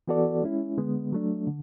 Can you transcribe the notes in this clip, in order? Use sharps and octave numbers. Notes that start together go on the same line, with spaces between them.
E3 B3 F#4 A4 D5
G#3 C#4 E4
D3 G#3 B3
F#3 A3 D4
D3